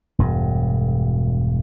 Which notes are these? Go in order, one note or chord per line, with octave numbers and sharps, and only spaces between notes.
E1 G2